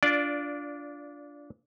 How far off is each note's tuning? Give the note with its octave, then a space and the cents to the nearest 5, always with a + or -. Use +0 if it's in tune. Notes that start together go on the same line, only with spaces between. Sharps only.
D4 -15 F4 +0 D5 +0